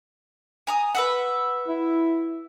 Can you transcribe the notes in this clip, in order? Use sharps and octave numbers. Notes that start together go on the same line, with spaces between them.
G#5 A#5 D#6
B4 E5 F#5
E4